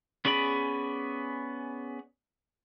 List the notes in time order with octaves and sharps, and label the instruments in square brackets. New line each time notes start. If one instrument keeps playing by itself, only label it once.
[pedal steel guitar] B3 C#4 G#4 D5 B5